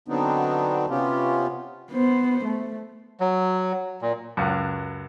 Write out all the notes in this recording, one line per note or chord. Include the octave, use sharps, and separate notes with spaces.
D3 F#3 B3 C4 D4 D#4
C3 B3 C#4 F4 G4
B3 C5
A3
F#3
A#2
C#2 F#2